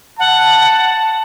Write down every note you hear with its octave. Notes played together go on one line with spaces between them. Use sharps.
F#5 A5